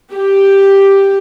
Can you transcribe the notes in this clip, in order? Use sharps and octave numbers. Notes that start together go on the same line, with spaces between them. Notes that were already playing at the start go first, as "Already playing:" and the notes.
G4